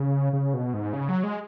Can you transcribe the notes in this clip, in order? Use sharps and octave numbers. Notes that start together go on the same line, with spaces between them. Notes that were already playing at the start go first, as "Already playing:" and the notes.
Already playing: C#3
C#3
B2
G#2
C#3
F#3
G#3